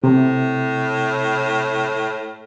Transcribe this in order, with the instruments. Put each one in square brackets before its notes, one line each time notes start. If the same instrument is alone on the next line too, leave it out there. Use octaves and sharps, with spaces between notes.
[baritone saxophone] A2 [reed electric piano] C3